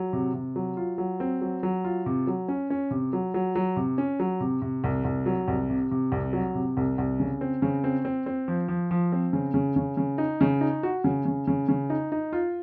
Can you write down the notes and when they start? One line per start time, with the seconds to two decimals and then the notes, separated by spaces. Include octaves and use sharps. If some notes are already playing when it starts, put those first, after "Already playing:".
Already playing: F#3
0.13 C3
0.34 C3
0.56 F#3
0.77 F4
0.98 F#3
1.20 C4
1.41 F#3
1.63 F#3
1.84 F4
2.06 C3
2.27 F#3
2.48 C#4
2.70 C#4
2.91 C3
3.13 F#3
3.34 F#3
3.55 F#3
3.77 C3
3.98 C#4
4.20 F#3
4.40 C3
4.62 C3
4.84 C2
5.05 C2
5.26 F#3
5.48 C2
5.70 C3
5.91 C3
6.12 C2
6.33 F#3
6.55 C3
6.77 C2
6.98 C2
7.20 C#3
7.41 C4
7.62 C#3
7.84 C4
8.05 C4
8.26 C4
8.48 F3
8.68 F3
8.91 F3
9.12 C4
9.33 C#3
9.54 C#3
9.76 C#3
9.97 C#3
10.18 D#4
10.41 C#3
10.61 D#4
10.83 F#4
11.04 C#3
11.25 C#3
11.47 C#3
11.69 C#3
11.90 D#4
12.12 D#4
12.33 F4